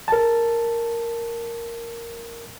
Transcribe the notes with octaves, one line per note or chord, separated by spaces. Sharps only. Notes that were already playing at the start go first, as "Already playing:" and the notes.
A#4 A5